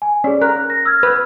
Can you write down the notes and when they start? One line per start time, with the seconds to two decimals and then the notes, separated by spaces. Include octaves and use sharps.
0.02 G#5
0.24 C#4 G#4 D5
0.42 A#4 F#6
0.70 A#6
0.85 E6 F6 G#6
1.03 B4